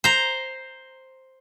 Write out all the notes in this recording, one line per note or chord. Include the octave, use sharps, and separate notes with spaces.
C5 A#5